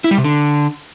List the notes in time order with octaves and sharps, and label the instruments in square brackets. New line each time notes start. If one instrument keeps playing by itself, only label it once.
[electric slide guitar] E4
G3
C3
D3